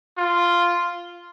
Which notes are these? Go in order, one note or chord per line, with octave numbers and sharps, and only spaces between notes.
F4